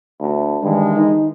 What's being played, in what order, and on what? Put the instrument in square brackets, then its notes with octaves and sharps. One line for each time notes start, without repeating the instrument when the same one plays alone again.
[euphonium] D2
[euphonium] G2 [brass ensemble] D#3 E3 G#3
[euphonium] D#4